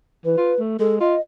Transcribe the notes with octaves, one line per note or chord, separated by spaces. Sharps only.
E3 B4
F4
A3
G#3 A4
F4 D#5